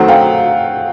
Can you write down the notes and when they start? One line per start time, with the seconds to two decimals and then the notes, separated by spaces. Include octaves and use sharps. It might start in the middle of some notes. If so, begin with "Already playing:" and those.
Already playing: D#3 F#3 A3 C4 F#5
0.08 F5 G5